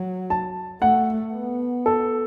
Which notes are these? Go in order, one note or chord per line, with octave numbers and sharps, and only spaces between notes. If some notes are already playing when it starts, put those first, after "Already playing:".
Already playing: F#3
A5
A3 F#5
B3
A4